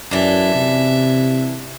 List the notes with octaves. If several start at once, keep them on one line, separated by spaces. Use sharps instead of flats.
F#2 E3 D4 E5
C3